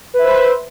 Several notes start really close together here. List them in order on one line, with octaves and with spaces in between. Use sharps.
B4 E5 C5